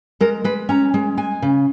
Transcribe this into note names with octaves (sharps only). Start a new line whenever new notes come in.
G#3 A#4
G#3 B4
C#4 A#5
G#3
G#3 G#5
C#3